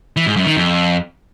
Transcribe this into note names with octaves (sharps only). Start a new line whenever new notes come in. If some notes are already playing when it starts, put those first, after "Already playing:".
E3
G#2
F#2
D#3
F2